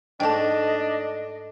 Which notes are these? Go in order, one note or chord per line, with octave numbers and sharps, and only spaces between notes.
G#2 A3 D4 D#5 G5 A5